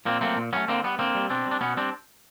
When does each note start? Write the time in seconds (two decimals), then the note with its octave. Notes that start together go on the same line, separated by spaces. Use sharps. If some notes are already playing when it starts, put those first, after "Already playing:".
0.05 A#2 A#3 C4
0.21 F#3 A3 A#3 C4
0.37 A#2
0.53 F#3 A3 B3 C#4
0.68 D3 A#3 C4
0.84 G3 B3
0.99 D3 A#3 C4
1.15 G3
1.30 B2 C4 D4
1.46 G3
1.51 D4
1.61 B2 B3 C#4
1.77 G3 C4 D4